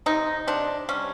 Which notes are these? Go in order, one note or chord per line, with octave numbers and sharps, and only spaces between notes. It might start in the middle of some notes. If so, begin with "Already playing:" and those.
C3 D#4
C3 D4
G3 C#4